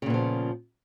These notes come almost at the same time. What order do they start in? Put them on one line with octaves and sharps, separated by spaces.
C#3 A#2 B3 F3